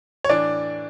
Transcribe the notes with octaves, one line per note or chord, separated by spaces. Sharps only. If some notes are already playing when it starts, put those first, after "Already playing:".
C#5
A2 E3 D4 D5